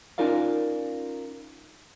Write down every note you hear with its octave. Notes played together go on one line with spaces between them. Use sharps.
C#4 D#4 F4 A#4 D5 F5